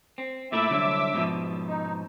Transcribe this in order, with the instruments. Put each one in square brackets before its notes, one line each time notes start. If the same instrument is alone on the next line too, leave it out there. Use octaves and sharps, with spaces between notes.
[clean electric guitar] C4
[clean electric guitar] A#2 A3 E4 [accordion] E5 D6 E6
[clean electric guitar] C2 D3 F#3
G#2 B2 F3
[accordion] D#4